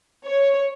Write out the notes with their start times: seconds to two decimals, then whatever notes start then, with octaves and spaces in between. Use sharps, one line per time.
0.25 C#5